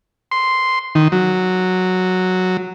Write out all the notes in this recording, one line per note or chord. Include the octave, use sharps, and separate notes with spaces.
C6
D#3
F#3